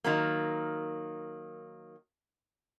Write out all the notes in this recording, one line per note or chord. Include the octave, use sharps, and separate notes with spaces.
D#3 F#3 A#3